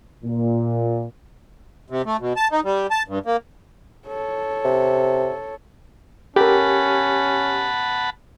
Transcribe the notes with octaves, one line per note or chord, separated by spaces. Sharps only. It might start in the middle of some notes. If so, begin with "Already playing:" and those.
A#2
C3
A3
B2
A5
D#4
G3
A5
G2
A#3
A4 C#5
C3
C#4 G4 A4 A#4 F#5 A5 B5